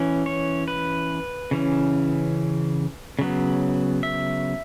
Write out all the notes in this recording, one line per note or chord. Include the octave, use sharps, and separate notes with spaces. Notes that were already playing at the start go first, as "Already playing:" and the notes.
Already playing: E3 C#4
C#5
B4
C#3 E3 C#4
C#3 F#3 B3
E5